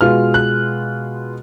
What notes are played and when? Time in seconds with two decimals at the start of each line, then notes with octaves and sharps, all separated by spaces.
0.01 B2 G#3 B3 F4 F6
0.34 F#6